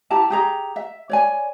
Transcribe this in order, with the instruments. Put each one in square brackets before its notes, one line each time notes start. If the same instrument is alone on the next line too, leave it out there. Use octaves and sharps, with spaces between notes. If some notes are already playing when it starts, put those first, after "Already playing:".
[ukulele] E4 G4 A5 A#5
G4 G#4 A#5
E5
C#5 D5 G#5